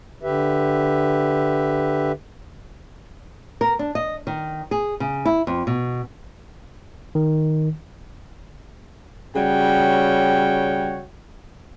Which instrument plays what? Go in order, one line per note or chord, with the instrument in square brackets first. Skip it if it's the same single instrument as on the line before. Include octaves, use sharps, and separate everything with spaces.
[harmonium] D3 G4 B4 E5
[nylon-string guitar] A#4
D4
D#5
D#3
G#4
C#3
E4
F2
B2
[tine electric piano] D#3
[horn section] C#3 G3 F#4 C#5 G5